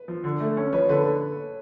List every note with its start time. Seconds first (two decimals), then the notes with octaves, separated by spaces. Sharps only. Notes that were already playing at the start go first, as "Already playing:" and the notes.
Already playing: B4
0.08 F3
0.24 D3
0.40 A3
0.57 C#4
0.73 F3 B4 C#5
0.89 D3 A4 B4